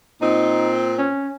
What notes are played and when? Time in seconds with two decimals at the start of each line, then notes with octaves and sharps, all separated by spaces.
0.22 A#2 C4 D#4
0.98 C#4